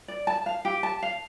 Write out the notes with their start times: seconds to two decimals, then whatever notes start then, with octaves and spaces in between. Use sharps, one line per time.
0.08 D5
0.27 A5
0.46 F5
0.65 G4
0.83 A5
1.02 F5